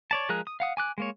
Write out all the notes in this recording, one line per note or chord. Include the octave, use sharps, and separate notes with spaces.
C#5 D5 A5
F3 G#3 G#4 A#4 F#6
D#6
F5 F#5 D#6
G#5 D6 F#6
G#3 A#3 C#5